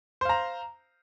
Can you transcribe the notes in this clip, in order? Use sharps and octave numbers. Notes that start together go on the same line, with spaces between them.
C5 F5 A#5